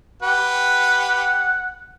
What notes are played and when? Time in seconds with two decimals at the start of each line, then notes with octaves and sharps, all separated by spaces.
0.22 G4 B4 F#5